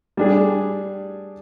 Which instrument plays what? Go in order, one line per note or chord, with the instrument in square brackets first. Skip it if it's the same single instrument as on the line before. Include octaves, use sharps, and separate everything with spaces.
[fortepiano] G3 D4 G#4